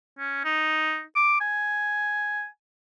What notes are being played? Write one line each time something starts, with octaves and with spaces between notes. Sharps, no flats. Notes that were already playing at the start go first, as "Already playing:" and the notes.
C#4
D#4
D6
G#5